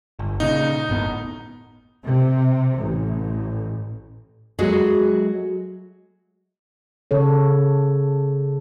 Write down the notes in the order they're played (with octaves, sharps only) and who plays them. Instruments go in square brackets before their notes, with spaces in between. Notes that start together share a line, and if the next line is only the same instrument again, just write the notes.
[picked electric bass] G1
[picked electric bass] A#2 C#3 [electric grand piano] D#4
[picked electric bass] G1 A2 B3
[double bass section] C3
A1
[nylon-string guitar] F#3 G#3 A3 F#4 G#4
[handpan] C#3 A4 C#5